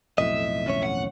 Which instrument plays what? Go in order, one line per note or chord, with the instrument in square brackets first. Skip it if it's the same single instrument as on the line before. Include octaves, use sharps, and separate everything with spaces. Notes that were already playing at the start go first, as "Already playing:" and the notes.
[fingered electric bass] B1 F2 A2 [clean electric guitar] D#5 [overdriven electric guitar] E5
[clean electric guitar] D#2 C#4 C#5
[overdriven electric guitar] F#5